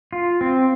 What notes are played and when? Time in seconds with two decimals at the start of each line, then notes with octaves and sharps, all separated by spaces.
0.13 F4
0.41 C4